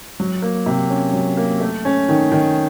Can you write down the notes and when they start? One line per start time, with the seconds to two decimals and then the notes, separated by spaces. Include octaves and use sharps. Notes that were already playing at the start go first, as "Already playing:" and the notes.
0.20 F#3
0.42 A#3
0.66 C3
0.90 C#4
1.13 F#3
1.37 A#3
1.60 A3
1.85 C#4
2.09 D#3
2.32 D#3